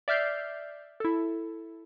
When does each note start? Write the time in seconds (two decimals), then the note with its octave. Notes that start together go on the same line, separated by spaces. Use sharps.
0.08 D5 E5 F6 G6 C7
1.00 E4 A4